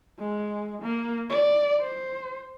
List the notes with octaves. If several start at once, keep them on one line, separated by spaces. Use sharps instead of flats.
G#3
A#3
D5
C5